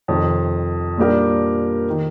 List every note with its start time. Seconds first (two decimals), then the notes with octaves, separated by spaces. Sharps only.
0.08 F2 C3 D#3
0.98 A#2 G3 D4 G4 A#4
1.90 D#3